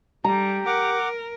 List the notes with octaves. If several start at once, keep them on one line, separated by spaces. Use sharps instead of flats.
G3 G4 A#5
A#4 F#5 D6